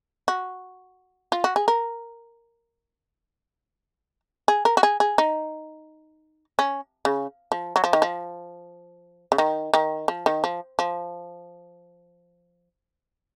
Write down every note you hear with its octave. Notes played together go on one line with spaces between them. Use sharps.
F#4
F4
F#4
G#4
A#4
G#4
A#4
F#4
G#4
G#4
D#4
C#4
C#3
F3
F#3
F3
D#3
F3
C#3
D#3
D#3
F3
D#3
F3
F3